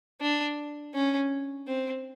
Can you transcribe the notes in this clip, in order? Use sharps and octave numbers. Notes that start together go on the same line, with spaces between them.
D4
C#4
C4